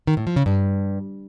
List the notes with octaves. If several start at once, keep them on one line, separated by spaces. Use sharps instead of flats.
D#3
A2
F3
C#3
G2